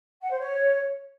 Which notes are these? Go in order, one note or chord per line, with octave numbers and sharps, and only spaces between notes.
F#5
C5
C#5